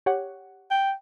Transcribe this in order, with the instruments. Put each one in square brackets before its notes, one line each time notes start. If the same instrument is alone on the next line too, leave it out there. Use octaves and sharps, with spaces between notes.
[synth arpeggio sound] G4 C#5 F#5
[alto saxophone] G5